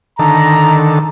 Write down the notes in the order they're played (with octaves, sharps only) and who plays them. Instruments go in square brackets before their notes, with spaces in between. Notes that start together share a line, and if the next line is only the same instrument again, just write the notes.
[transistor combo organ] D3 D#3 A4 [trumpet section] A#5